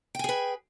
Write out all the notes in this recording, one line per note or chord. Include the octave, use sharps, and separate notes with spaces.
G#4 B4 G5 G#5